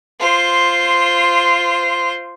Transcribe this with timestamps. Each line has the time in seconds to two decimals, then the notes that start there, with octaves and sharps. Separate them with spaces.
0.20 F4 C5